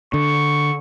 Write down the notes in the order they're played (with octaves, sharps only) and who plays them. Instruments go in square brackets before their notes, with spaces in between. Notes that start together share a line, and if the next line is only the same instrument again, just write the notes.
[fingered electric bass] D3 [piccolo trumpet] C#6